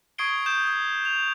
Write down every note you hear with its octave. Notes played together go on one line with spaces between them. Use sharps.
C#6 D#6 G#6 C7 D7 G7
D#6 G6 E7
D#6
F7